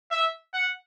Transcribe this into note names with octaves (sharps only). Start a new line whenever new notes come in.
E5
F#5